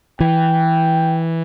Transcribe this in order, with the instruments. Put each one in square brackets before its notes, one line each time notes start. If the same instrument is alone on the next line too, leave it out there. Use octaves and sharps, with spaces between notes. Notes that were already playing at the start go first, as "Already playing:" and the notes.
[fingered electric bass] E3 [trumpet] G5